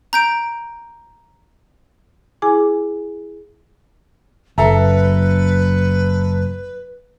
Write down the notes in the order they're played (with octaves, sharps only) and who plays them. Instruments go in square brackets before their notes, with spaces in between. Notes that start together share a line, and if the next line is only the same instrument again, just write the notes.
[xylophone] A#5 G6 D7
[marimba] E4 G#4 G#5 D6
[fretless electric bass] F#1 [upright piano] A4 E5 A#5 [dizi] B4